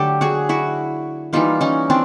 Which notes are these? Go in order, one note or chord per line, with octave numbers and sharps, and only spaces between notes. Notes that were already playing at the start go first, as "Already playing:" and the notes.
Already playing: D3 F#3 A3 G4 A4
F#4 G#4
E4 F#4
E3 G3 A#3 D#4 F4
C#4 D#4
C4 D4